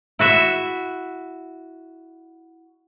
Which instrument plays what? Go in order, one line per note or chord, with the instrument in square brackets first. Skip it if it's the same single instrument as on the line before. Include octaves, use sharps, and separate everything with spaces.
[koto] E4 F#4 E5